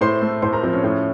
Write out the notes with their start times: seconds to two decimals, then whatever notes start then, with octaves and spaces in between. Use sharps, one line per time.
0.01 A2 C5 C6
0.22 A3
0.42 A2 C5 C6
0.53 A#4 A#5
0.63 F3 C4 C5
0.73 C#4 C#5
0.84 A2